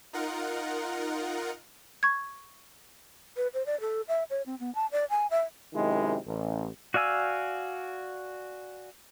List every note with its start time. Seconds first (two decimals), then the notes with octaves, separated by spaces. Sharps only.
0.13 D#4 F4 A#4 F#5
2.03 C#6 G#6
3.37 B4
3.54 C5
3.66 D5
3.81 A4
4.08 E5
4.30 C#5
4.46 C4
4.59 B3
4.75 A5
4.92 D5
5.10 G#5
5.31 E5
5.74 F#2 C3 D#3 G#3 E4
6.26 A1
6.94 F#4 D5 F5 G#5 E6